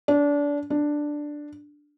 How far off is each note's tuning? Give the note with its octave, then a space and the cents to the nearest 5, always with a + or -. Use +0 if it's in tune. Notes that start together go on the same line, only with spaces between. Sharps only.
D4 -25
D4 +5